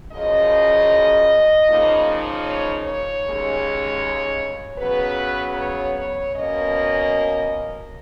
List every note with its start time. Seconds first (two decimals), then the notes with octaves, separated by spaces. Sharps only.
0.12 F#2 C#3 F3 D#5
1.67 C#3 F3 A#3 D#4
2.46 C#5
2.84 C#5
3.24 D#2 C#3 G#3
4.78 C#3 F#3 B3 B4
5.57 C#5
5.96 C#5
6.34 B2 A#3 C#4 D#5